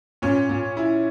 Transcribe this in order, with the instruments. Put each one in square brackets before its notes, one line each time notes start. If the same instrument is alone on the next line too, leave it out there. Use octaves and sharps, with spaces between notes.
[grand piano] A#2 [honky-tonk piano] C#4
[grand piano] A#2
E4